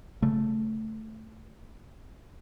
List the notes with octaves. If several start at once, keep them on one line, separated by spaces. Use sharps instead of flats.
C#3 A3